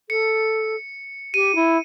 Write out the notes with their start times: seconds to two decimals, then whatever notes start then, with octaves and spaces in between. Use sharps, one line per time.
0.09 A4 C#7
1.34 G4 D#7
1.55 E4